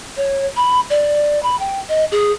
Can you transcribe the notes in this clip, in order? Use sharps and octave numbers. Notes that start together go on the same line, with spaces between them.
C#5
B5
D5
B5
G5
D#5
G#4